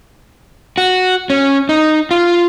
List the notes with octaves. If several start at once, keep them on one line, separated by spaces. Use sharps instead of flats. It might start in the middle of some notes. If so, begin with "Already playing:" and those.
F#4
C#4
D#4
F4